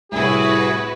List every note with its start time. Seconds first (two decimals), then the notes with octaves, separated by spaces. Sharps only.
0.12 C2 A2 E4 F#4 G#4 B4